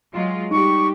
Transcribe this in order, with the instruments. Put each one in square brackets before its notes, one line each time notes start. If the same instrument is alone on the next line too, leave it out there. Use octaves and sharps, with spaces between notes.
[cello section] F#3 G#3 F4
[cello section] G3 G4 [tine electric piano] D#4 [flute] C#6